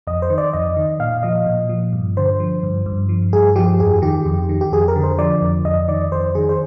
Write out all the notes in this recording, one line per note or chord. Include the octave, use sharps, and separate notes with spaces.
F2 D#5
C5
D#3
D5
F2 D#5
D#3
A#2 F5
F3 D#5
A#2
F3
G2
D3 C5
F3
G2
G2
F3
G2 G#4
F3 G4
F2 G#4
D#3 G4
F2
D#3
G4
F2 G#4
A#4
D3
C5
F3 D5
F2
F2 D#5
D#3 D5
F2 C5
D#3 G#4
C5